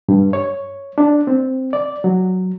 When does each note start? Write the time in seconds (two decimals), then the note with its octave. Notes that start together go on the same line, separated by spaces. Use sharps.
0.09 G2
0.33 C#5
0.98 D4
1.27 C4
1.73 D5
2.04 F#3